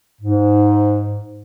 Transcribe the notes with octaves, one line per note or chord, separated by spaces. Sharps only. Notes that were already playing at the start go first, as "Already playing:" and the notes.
G#2